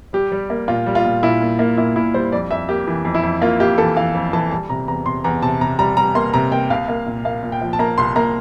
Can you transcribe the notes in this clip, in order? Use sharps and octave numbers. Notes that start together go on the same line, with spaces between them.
G3 G4
G3
A#3
A#2 F4
G3
F4
A#2
A#2 E4
A#2
A#3
A#2 E4
A#2 E4
G3 C5
F2 D5
F2 E5
A#3 G4
E3
F2
E4
F2
A#3 F4
A#3 G4
E3 A4
E3 F5
F2
E3 A5
G3 A5
C3 A#5
E2 A#5
C3 C6
E2 A#5
C3 A5
C3 A#5
G3 A#5
G3 A#5
A#3 C6
C3 A#5
A#3 G5
C2 F5
A#3
A#2
A#3 F5
A#2
G5
F3
A5
A#3 A#5
C2 C6
A#3 A#5